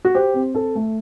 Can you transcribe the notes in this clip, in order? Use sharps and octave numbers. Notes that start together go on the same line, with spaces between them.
F#4
G4 C5
C4
A4
A3